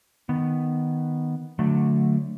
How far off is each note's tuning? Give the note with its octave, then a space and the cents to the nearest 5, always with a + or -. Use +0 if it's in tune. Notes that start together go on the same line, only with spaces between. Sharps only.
D#3 +0 B3 +0
D3 +0 F#3 -20 A3 +0